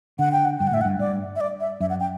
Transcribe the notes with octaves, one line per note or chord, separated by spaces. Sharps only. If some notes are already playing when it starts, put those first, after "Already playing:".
D3 F#5
G5
F#5
G2 G5
F#5
A2 E5
F#5
G2
G2 D5
E5
D5
E5
F#2 E5
F#5
G5